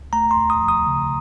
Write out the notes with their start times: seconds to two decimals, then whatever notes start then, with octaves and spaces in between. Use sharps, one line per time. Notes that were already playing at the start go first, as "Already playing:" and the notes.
Already playing: C#2
0.13 A3 A#5
0.31 C6
0.37 D#2
0.50 D#6
0.62 F3
0.68 D#6
0.87 C#3